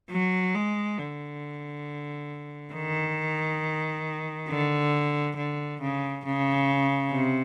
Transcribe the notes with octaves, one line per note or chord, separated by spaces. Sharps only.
F#3
G#3
D3
D#3
D3
D3
C#3
C#3
C3